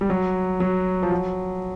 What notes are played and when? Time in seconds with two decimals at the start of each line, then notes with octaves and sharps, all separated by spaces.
0.01 G3
0.10 F#3
0.60 F#3
1.03 F3
1.12 F#3